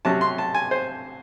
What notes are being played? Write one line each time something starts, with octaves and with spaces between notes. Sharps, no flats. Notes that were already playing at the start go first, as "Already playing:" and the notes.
C3 F#3 C#4 A5
C6
A5
G#5
C5